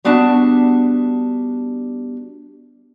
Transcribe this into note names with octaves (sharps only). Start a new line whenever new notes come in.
G3 B3 D4 F#4 E5 A5